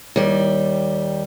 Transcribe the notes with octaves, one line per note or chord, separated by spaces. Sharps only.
D#2 G3